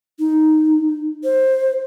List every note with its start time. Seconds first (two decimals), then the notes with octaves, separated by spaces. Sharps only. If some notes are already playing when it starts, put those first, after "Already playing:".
0.19 D#4
1.24 C5